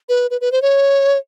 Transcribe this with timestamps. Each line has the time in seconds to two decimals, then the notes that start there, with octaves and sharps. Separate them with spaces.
0.09 B4
0.31 B4
0.41 B4
0.52 C5
0.62 C#5